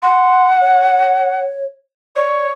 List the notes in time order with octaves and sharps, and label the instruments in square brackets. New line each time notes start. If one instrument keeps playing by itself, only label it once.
[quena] F#5 [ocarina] C6
[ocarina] C#5
[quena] C#5 [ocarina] D5